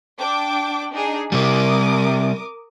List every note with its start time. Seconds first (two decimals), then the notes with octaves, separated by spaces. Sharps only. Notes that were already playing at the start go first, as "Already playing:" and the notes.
0.19 D4 G5 D6
0.94 D4 D#4 G#4
1.32 C3 G3 A#4 D6 D#6